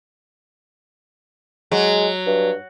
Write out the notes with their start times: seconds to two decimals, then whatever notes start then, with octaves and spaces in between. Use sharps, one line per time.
1.72 F#3 G#3
2.26 G2